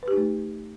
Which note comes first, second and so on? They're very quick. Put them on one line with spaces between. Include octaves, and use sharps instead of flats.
B4 G4 D#4 A3